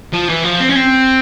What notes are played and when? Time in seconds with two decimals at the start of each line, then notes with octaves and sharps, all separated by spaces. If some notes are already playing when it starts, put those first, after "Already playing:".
0.13 F3
0.29 E3
0.44 F3
0.60 C4
0.70 C#4
0.75 C4